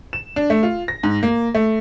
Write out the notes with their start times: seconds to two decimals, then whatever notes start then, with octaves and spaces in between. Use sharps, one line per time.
0.13 E7
0.36 D4
0.50 A3
0.63 F4
0.88 A#6
1.03 G#2
1.23 A#3
1.55 A3